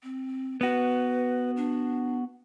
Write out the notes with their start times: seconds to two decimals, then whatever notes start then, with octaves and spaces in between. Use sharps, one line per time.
0.03 C4
0.61 B3 F#4 B4
1.57 D4